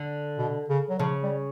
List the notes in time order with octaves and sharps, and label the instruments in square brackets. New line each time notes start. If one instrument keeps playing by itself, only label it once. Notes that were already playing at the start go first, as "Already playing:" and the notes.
Already playing: [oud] D3
[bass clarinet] B2
C#3
F#3
[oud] C#3 [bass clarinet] F3
[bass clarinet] G3